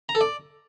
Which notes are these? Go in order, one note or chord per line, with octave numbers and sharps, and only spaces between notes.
A#5
A4
D5